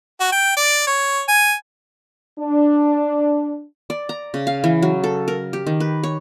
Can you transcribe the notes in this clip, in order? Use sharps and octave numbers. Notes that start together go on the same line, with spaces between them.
F#4
G5
D5
C#5
G#5
D4
D5
A#5
C#3
F5
E3
F#3
A4
A#4
G4
D#3
B4
C#5